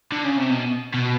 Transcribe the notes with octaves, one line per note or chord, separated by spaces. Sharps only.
D3
C#3
C3
B2
B2